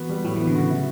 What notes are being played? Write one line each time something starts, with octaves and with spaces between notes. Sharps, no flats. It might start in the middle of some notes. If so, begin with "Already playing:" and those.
Already playing: E3 B3 F#4
G3
A2 F#3
E3 B3
D3
C#3 F#4
E4